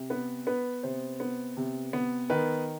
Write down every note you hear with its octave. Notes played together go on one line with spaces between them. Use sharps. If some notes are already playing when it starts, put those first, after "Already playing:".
Already playing: C3
B3 B4
B3 B4
C3 C5
B3
C3
B3
D#3 B4